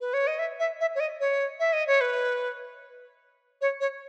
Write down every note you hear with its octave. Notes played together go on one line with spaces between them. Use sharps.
B4
C#5
D#5
E5
E5
E5
C#5
D#5
C#5
E5
D#5
C#5
B4
C#5
C#5